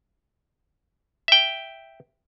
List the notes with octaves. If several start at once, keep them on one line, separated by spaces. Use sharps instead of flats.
E5 G5